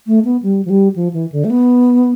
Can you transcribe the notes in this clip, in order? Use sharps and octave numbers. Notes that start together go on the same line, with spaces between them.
A3
B3
G3
F3
G3
F3
E3
D3
A3
B3